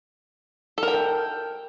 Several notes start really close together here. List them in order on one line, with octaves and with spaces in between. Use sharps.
A4 A#4 G5